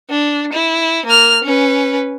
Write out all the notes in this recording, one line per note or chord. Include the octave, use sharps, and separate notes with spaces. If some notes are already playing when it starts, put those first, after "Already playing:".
D4
E4
A#3 F6
C#4 B4